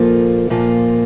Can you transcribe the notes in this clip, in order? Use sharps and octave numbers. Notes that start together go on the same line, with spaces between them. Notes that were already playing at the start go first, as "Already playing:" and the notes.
Already playing: A#2 F3 A#3 F4 A4
A#2 F3 A#3 F4